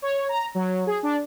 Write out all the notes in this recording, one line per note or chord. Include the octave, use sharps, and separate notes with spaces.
C#5
A#5
F#3
G#4
D4